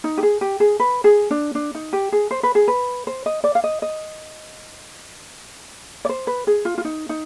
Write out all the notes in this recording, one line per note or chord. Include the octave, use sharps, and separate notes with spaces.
D#4
G4
G#4
G4
G#4
B4
G#4
D4
D4
D#4
G4
G#4
C5
B4
G#4
B4
C5
D#5
D5
F5
D#5
D#5
D5
C5
B4
G#4
F4
F4
D#4
D#4